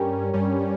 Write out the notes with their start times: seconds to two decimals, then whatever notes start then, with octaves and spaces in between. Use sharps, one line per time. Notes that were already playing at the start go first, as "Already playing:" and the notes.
Already playing: G2 G3 C#4 G4 A#4
0.34 G2 G3 C#4